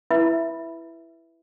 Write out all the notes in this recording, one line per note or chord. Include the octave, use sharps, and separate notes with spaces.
E4 B4 E5 B5